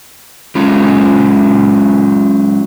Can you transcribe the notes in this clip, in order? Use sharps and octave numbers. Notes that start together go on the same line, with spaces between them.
F#3 G#3 C#4 F4